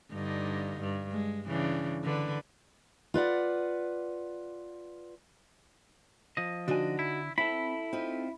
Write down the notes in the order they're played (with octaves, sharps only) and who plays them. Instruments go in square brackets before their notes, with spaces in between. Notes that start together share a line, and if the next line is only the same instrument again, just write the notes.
[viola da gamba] G2 D3 D#4
G2
G#3
C#3 E3 D4
D3 B4
[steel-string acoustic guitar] F4 B4 D5 F#5
[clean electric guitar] F3 D#5
[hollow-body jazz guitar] D3 G#5 [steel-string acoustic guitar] D4 D#4 F#4
[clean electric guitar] E4
[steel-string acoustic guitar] C4 [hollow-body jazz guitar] E4 [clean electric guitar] A4 B5
[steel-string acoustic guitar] C4 D#4 F4